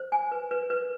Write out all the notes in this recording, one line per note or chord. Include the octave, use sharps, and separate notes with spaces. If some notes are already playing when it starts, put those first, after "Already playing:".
Already playing: C5
G#5
B4
B4
B4